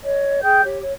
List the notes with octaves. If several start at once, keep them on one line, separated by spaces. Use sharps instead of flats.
C#5 D#5
G#4 G5 G6
G4 C#5
C#5